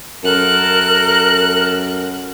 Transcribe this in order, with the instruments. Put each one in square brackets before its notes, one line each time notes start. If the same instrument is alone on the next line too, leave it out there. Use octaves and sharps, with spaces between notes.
[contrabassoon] F#2 [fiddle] A4 F#6 [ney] A#4